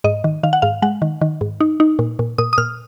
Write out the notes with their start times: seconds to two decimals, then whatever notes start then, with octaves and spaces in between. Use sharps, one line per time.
0.04 G#2 D#5
0.24 D#3
0.43 D#3 F5
0.53 F#5
0.62 G#2 F5
0.82 G#3 F#5
1.02 D#3
1.21 D#3
1.41 G#2
1.60 D#4
1.80 D#4
1.99 A#2
2.19 A#2
2.38 A#2 D#6
2.53 D#6
2.58 A#2 F6